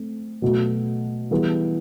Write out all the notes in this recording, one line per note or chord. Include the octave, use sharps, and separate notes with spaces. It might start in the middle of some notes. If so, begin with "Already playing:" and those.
Already playing: A3 C4
B2 F#3 A3
E3 G3 B3 E4 G#4